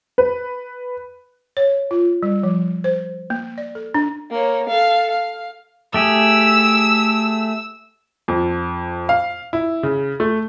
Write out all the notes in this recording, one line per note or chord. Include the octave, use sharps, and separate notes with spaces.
B4
C#5
F4
G3
F3
C5
A#3
D5
A4
D4
A#3 C#5
A4 F5
F5
A3 G4 G#4 E6
F2
F5
E4
C#3
A3